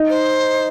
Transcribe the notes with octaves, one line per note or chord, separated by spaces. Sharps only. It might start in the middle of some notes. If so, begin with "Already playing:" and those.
Already playing: D#4
C5